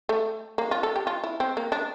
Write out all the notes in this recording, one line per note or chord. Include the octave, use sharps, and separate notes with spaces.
A3
A#3
F4
A4
G4
F4
E4
C4
A#3
D4